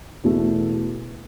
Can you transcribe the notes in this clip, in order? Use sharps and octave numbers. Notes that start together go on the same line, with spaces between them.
E2 B2 A3